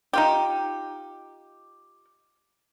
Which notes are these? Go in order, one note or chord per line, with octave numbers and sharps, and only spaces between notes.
D#4 F4 G4